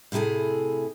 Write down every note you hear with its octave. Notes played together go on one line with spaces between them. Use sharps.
A2 C3 E4 G#4 A4